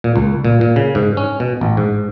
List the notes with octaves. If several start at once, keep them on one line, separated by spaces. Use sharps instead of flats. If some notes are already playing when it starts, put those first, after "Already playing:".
A#2
C#2
A#2
A#2
C#3
G#2
C#4
B2
A1
G#2